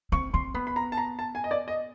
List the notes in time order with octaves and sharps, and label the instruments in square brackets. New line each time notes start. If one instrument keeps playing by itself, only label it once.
[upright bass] C4 [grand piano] C#6
[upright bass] C4 [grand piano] C6
[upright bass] B3 [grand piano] B5
[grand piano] B5
A#5
A5
A#5
A5
G#5
D#5
D5
D#5